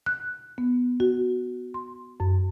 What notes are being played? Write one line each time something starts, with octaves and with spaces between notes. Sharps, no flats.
F#6
B3
F#4
C6
F#2